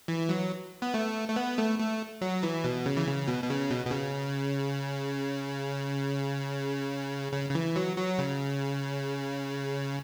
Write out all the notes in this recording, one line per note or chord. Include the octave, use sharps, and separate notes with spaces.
E3
F#3
B3
A3
A3
B3
A3
A3
F#3
E3
B2
C#3
E3
C#3
B2
B2
C#3
B2
B2
C#3
C#3
C#3
E3
F#3
F#3
C#3